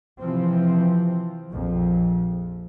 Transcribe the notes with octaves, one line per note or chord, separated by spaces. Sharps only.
C3 E3 F3 C4
A#1 F2